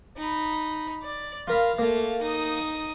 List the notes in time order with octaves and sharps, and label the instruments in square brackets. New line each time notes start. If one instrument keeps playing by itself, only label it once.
[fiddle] D#4 B5
D5
[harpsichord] F4 A#4 B5 [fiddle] F5
[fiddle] A3 F5 [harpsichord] A#3
[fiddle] D#4 D#6